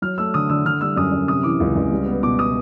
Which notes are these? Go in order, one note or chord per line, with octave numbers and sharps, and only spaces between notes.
F#3 F6
A3 E6
D3 D#6
D3 E6
D3 F6
G3 E6
F#2 D#6
F#2
C3 D#6
E3 D6
C#2
C#2
G3
B3
B2 D6
B2 D#6